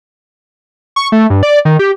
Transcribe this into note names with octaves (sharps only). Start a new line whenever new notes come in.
C#6
A3
G2
D5
D#3
G4